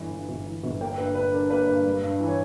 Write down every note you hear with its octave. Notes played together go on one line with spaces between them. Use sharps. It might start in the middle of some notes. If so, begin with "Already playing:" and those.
Already playing: G1 E3
G2
G1
E3
G1
A#3 G5
G2 B4
D3 B4
D4 A#4
A#3 B4
G2 B4
G3
G2
E3
C#5